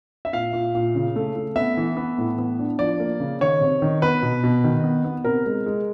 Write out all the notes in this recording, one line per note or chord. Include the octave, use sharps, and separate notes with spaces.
E5
A#2 F5
A#2
A#2
C#3
A3
A3
B3 E5
E3
B3
A2
B3
D4
F3 D5
A#3
C#3
D#3 C#5
C3
D#3
B3 B4
B2
B2
D#3
B3
B3
C3 A#4
G#3
G#3